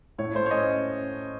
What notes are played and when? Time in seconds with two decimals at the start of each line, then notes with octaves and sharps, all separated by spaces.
0.18 A2 C#5
0.35 A3 C5
0.46 C#5
0.51 C#4 D#5